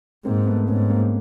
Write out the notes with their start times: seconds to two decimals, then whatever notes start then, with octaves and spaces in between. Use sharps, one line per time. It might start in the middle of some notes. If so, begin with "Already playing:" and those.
0.25 G#2 A#3 C4
0.46 A3 B3
0.68 G#2 B3 C#4
0.90 A#3 C4